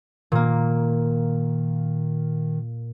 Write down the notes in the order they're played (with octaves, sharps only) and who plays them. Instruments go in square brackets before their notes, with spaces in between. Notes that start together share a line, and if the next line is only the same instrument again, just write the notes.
[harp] A#2 A#3 [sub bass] D#3